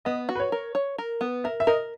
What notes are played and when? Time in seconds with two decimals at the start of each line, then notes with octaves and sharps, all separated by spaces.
0.05 B3 D#5
0.29 F#4
0.35 B4
0.40 C#5
0.52 A#4
0.75 C#5
0.98 A#4
1.21 B3
1.44 A#4 E5
1.60 E5
1.67 A#4 D#5